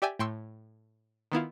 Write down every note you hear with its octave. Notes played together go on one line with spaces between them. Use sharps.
G4 D5 E5 G5 G#5
A2 G5 C6 C#6 E6
D#3 B3 E4 F4